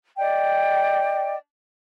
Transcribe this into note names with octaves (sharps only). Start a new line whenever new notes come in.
D5 D#5 G5